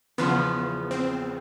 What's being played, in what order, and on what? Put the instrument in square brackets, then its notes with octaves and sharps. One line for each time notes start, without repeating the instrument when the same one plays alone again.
[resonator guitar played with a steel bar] E2 C#3 F3 [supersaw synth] B3
[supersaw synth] C4